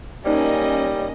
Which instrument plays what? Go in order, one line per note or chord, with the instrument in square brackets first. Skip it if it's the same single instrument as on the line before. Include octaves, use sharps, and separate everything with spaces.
[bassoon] G3 [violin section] A#3 C#4 D#5 [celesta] D#4 C5 D5